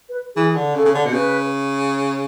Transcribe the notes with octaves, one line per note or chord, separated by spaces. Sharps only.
B4
E3 G#4
D3
C#3 A4
C#3
D3
B2
C#3 B4